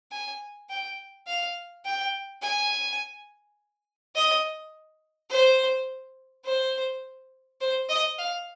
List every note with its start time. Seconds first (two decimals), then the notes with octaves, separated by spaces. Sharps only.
0.12 G#5
0.69 G5
1.27 F5
1.85 G5
2.42 G#5
4.15 D#5
5.30 C5
6.45 C5
7.61 C5
7.89 D#5
8.18 F5